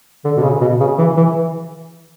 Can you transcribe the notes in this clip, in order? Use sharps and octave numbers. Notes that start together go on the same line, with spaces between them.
D3
B2
C#3
B2
C#3
E3
E3